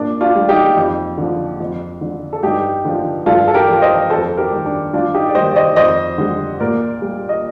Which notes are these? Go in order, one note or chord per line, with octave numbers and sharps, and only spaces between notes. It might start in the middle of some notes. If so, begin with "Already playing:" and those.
Already playing: A#2 D4
D4 F4
G3
D#4 G4
F2
D3 F3
F2
D3 F3
A4
G2 D#4 G4
D3 F3
G2 F4 A4
A4
G4 A#4
F3
C5 D#5
F2 A4 C5
G4 A#4
D#3 G3
D4
G2 D4 F4
D#4 G4
D5
D#3 G3 C5 D#5
D5
C5 D#5
F2 C5 D#5
D3 G3
A#2 A#4 D5
G3
D#5